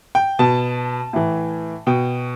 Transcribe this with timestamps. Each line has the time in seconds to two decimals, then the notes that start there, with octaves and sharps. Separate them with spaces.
0.15 G5
0.39 B2 A5
1.13 A2 E3
1.87 B2 G5